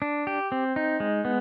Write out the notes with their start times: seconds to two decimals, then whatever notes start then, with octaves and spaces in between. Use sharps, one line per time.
0.02 D4
0.27 G4
0.52 C4
0.76 D#4
1.00 G#3
1.25 B3